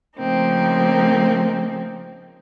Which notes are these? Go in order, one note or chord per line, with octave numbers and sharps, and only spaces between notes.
C#3 F3 A3 A#3 C4 D#4